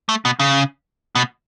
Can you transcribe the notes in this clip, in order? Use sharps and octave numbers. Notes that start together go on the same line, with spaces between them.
A3
B2
C#3
B2